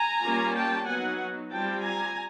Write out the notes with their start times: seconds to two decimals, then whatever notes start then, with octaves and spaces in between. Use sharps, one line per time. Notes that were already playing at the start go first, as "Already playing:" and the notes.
Already playing: G#5 A#5
0.21 G3 A#3 C#4 F4
0.53 G5 A5
0.85 F#3 B3 D#4 F#5 G#5
1.50 G3 C4 F4 G5 A5
1.82 G#5 A#5